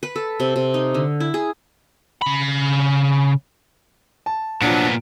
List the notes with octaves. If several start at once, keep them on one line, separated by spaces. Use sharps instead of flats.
B4
A4
C3
C3
D#4
D3
E4
G#4
C#3 B5
A5
A#2 F3 F#3 B3 D4 D7